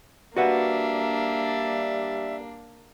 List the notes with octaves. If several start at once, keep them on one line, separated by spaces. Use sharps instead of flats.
G3 A#3 D4 F#4 B4 E5 F#5